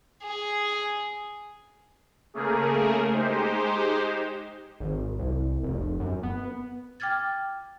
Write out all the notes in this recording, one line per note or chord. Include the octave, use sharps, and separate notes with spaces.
G#4
C#3 A3 A#3 G#4 A#4
G#3 D#4 G4 C5
G#1
C2
F1
F#2
B3
G5 D6 F6 G#6 A6